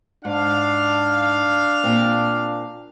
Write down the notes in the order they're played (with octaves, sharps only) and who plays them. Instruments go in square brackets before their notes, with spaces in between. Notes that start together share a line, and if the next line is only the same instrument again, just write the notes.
[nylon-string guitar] G#2 [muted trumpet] D4 [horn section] F5
[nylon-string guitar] A#2 C4